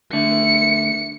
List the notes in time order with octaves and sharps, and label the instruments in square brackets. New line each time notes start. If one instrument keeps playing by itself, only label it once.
[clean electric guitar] D3 A3 [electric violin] C#7